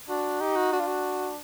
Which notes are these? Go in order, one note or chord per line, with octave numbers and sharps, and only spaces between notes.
D4 F#4
D#4 G4
F#4
D4 F#4
F4
F#4